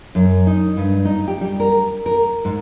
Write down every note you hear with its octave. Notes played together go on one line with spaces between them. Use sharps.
F#2
D#4
G2
D#4
G4
G3
A#4
A#4
G#2